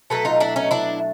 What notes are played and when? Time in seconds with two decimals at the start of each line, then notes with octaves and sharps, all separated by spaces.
0.10 B2 F#3 A3 A4 B4
0.25 D#4 F4
0.40 D4 E4
0.56 C#4 D#4
0.71 D4 E4